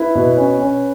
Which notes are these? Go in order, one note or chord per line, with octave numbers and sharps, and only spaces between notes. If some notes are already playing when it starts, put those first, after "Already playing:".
Already playing: E4 B4
B2
C#4
C#4